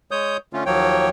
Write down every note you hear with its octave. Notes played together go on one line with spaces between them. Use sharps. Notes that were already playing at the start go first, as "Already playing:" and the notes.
G#3 C#5 D#6 G6
D3 A3 C#4 F4
D#2 F3 F#3 A#3 C#5 G5